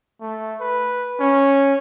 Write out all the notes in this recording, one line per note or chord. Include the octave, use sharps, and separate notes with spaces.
A3
B4
C#4